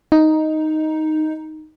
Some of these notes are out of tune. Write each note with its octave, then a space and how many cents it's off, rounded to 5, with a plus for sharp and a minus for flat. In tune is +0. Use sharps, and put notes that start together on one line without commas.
D#4 +5